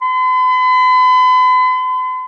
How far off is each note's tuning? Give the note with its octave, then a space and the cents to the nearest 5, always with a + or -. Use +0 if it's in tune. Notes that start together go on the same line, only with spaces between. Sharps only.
B5 +45